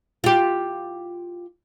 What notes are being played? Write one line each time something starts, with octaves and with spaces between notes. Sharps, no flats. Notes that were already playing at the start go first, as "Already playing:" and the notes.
F4 G4